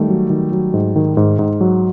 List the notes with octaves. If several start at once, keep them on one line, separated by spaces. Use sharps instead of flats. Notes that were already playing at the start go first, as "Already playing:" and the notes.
Already playing: D#3 G3 A3
F#3
D#3
F#3
G#2
D#3
G#2
G#2
F#3